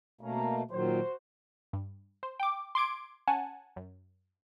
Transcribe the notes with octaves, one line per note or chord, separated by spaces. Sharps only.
B2 A3 A#3 C#4 A#5
A#2 D#3 F#3 F#4 C5
G2
C5
G5 D6
C6 D6 G#6 D7
C#4 F#5 G#5 A5
F#2